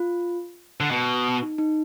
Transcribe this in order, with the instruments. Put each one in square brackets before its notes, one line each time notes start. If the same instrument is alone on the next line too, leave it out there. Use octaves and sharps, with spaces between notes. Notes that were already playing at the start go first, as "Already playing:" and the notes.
Already playing: [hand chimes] F4
[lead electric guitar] D3
B2
[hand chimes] D#4
D#4